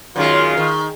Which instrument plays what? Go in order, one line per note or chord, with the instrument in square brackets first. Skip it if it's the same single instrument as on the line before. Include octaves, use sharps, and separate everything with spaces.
[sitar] F#2 D#3 G#3 [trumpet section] F4
[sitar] D#3